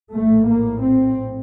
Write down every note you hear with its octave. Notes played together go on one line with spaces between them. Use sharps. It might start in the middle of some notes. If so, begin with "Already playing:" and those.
A#1 A2 A3
A#3
C4